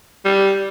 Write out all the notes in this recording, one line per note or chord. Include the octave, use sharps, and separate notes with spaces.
G3